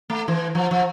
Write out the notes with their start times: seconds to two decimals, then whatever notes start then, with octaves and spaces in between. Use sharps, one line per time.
0.10 A3
0.28 E3
0.55 F3
0.71 F3